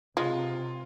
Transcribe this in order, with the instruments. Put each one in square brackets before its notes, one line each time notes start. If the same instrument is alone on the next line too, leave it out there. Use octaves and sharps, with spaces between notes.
[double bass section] C3 [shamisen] G#3 [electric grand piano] F4